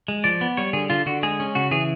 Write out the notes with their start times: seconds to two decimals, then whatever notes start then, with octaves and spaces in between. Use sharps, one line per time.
0.08 G#3
0.24 F3 D5
0.41 B3
0.57 G3 C#5
0.73 D3 G#4
0.90 D3 F4
1.06 D3 F#4
1.23 G#3 G#4
1.40 C#4
1.55 C#3 F#4
1.71 E3 G#4